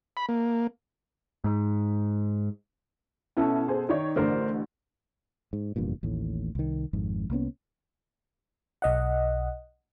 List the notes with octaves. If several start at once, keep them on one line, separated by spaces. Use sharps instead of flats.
B5
A#3
G#2
B2 C#4 E4 A4
G#4 C5
D#3 D#4 C#5 D5
A1 D3 A#4 C5 D5
G#2
F1 E2 G2 A#2
A1 D#2 A2
C2 D#3
G#1 F2 G#2
C2 A#3 B3 C#4
B1 D#5 F#5